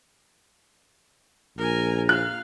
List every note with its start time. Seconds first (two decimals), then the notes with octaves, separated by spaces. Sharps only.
1.58 A#1 A#4 G#5
2.09 F5 F#6